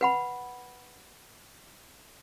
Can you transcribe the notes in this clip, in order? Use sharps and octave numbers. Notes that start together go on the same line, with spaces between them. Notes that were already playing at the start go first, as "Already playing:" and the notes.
B4 F#5 B5